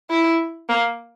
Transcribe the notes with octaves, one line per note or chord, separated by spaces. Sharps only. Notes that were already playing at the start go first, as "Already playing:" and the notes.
E4
A#3